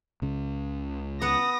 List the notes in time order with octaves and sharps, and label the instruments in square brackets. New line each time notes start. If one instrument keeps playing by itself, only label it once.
[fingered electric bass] C#2 C#3
[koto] B3 F#5 [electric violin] D#6 A#6